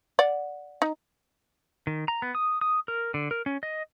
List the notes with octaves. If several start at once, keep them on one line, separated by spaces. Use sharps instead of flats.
D5 F#5
D#4
D#3
A#5
B3
D#6
D#6
A#4
D3
A#4
C#4
D#5